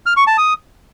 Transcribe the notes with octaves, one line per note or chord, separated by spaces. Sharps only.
F6
C#6
A5
D#6